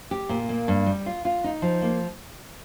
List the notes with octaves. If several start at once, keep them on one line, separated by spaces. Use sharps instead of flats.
G4
A#2
A#3
G2
G3
F4
F4
D#4
F3
A#3